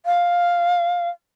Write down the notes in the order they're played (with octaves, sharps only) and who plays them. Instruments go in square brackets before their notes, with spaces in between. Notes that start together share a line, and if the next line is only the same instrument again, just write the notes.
[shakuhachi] F5